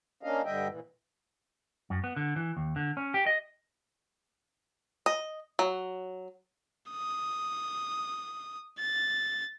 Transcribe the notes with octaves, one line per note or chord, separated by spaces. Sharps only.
A#3 C#4 D4 D#5 F5
G2 D3 G3 D#5 E5 G5
A#2 E3
F#2
B3
D3
E3
D#2
D3
C#4
G4
D#5
D#5
F#3
D#6
A6